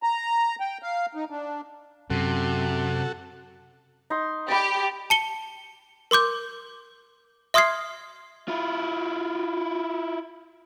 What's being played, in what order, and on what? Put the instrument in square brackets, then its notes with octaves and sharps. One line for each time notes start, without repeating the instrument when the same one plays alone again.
[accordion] A#5
G5
F5
D#4
D4
[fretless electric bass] F#2 [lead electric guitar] C3 [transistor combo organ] F#4 A4
[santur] D#4 C6
[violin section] G4 [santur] D5 B5
[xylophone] A5 C#7 G7
A#4 C6 D6 G6
E5 C6 D#6 F6 G#6 C7
[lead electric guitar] E4 F4